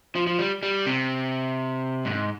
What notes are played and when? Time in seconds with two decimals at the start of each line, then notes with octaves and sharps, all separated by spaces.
0.15 F3
0.27 F3
0.39 G3
0.63 G3
0.86 C3
2.05 G#2